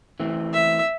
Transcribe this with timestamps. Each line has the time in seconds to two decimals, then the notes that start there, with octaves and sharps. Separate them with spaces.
0.20 E3 A3 C4
0.53 E5